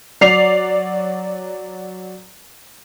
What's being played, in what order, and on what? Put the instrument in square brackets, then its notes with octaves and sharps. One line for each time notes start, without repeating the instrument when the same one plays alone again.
[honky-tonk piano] F#3 D5 C7 F7